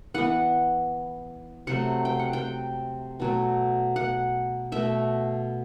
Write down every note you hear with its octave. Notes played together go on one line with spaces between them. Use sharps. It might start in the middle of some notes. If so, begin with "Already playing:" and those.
E3 B3 F#5
C3 F#3 A3 F#5
G5
F#5
G5
B2 F#3 A3
F#5
B2 A3 E5